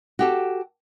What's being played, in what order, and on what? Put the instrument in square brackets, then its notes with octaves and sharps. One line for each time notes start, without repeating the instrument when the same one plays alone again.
[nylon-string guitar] F#4 G4 A4